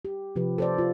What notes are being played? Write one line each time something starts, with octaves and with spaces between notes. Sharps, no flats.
G4
C3 F3 G4 B4
A4 C5 D5
D#4 F4